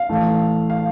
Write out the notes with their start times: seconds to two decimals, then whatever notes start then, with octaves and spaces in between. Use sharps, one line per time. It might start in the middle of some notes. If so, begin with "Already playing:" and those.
Already playing: F5
0.09 A1 A2 A3
0.70 F5